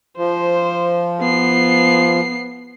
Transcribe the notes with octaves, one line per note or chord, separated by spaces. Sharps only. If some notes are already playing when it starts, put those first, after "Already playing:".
F3 C5
B3 C7